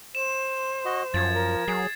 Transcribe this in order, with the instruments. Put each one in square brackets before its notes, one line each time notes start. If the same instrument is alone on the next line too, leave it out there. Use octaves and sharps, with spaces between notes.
[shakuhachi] C5 [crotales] E7
[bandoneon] F#4 D#5
[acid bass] F#2 [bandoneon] F3 [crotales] G#6 A6
[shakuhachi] A#4
[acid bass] F#3 [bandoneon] G#4 [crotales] C7